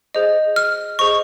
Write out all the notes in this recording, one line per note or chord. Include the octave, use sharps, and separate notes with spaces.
G#4 C5 D#5
F6
G#4 C5 D#5 C#6